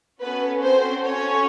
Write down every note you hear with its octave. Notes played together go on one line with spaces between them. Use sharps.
B3 C#4 F#4 A4 B4
C4 C5
C#4 C#5